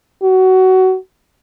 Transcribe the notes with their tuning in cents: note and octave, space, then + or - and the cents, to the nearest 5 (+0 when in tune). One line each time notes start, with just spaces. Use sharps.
F#4 +20